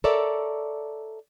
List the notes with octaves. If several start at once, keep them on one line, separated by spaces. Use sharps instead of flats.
A4 A#4 C#5 D5 E5